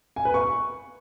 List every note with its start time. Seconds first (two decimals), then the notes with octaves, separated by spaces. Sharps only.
0.16 G#5
0.25 B4
0.34 C#6